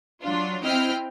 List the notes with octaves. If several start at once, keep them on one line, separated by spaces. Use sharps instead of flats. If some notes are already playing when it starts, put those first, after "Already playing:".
F#3 D4 F4
C4 E4 D#5 G5 F6